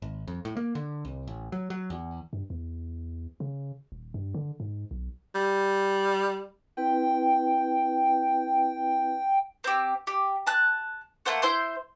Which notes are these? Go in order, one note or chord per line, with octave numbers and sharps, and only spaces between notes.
G#1
F2
A2
A#3
D3
C2
A1
F#3
F#3
E2
G2
E2
C#3
D#1
G2
D3
G#2
B1
G3
C4 E4 B4 G5
C4 G4
G4
A5 F#6
A3 A#3 C5 F#5
E4 C5 C6 G6